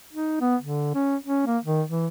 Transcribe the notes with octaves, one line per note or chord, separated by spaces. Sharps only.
D#4
B3
D3
C#4
C#4
A#3
D#3
E3